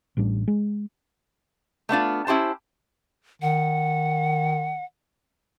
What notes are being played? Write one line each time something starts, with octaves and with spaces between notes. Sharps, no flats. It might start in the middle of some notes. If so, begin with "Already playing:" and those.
A1 A2 G3 D4
G#3
A3 B3 D4 F4
C#4 E4 G4 C5 A5
D#3 F#5